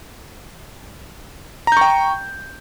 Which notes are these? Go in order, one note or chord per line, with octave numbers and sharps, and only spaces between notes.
G5 A#5 C#6 G6